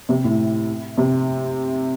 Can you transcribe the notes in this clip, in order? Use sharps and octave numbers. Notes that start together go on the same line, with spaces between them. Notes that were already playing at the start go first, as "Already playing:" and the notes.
C3
A2
C3